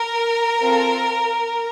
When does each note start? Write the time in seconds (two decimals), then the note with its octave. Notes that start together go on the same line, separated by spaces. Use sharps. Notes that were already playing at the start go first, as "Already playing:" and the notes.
Already playing: A#4
0.60 C4 F4 A4